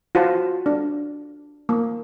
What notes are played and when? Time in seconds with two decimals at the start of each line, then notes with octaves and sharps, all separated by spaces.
0.15 F4 F#4 C5 A5
0.66 D4
1.69 A#3